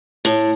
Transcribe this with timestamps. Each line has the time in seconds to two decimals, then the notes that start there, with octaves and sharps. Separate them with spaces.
0.25 A2